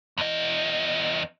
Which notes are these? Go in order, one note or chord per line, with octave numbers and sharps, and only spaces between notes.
E2 D#5